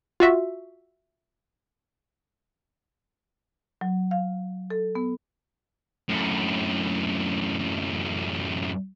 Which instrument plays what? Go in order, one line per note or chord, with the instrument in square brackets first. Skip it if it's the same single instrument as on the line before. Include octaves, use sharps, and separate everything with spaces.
[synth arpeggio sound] F4 F#4 E5
[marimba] F#3
F5
A4
B3
[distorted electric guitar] F#2 A2